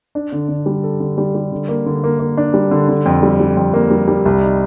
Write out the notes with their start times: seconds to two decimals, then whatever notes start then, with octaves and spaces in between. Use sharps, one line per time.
0.15 D4
0.32 D3
0.49 D3
0.66 G3
0.84 A4
1.00 D3
1.18 G3
1.35 G3
1.52 D3
1.69 A#3
1.86 D3
2.04 A#3
2.20 A#3
2.37 D4
2.54 G3
2.71 D3
2.89 D3
3.06 F2
3.23 G3
3.40 G3
3.57 F2
3.74 A#3
3.91 G3
4.08 G3
4.26 C2
4.42 D#4